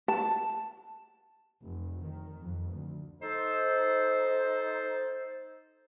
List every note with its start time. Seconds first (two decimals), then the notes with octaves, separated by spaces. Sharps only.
0.08 A5
1.61 F1
2.03 D#3
2.41 F2
2.70 D2
3.22 D#4 A4 C5